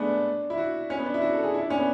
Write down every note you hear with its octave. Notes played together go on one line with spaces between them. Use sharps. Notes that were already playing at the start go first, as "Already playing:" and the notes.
Already playing: G#3 A3 B3 D4
E4
F#4
C#4
B3
D4
E4
F#4
A4
G#4
E4
D4
C#4
B3